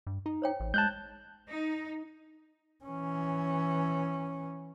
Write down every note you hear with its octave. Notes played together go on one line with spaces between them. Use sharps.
G2
D#4
C5 C#5 G5
A1
G#3 A5 F#6 G6
D#4
E3 C#4